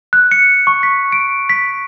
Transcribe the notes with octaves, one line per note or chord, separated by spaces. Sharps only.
F#6
C#7
C#6
B6
D7
B6